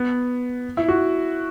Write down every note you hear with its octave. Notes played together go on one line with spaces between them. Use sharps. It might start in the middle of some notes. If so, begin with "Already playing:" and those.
Already playing: B3
E4
F#4